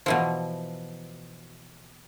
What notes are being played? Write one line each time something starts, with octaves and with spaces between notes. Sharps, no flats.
B2 E3 F3